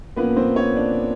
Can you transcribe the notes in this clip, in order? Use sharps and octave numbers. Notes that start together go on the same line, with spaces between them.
A#2 F3 A#3 B3 C#4 B4
C4 C5
C#4 C#5
D4 D5